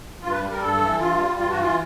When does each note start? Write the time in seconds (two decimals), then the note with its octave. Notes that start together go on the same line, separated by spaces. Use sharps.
0.22 G2 F4
0.32 B4
0.41 G3
0.52 A#4
0.61 G2 A4
0.80 E3
1.00 G2 F4
1.19 G3
1.38 G2 F4
1.49 F#4
1.58 E3 F4